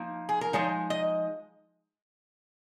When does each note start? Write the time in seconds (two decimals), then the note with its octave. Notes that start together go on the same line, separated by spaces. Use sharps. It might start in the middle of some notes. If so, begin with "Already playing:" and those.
Already playing: F3 A#3 D#4
0.29 G#4
0.41 A#4
0.53 F3 G#3 D#4 C#5
0.90 D#5